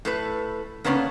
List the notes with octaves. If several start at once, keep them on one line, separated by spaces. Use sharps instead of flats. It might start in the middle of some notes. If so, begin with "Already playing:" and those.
A2 A4 B4
C#3 A#3 B3 C#4 D4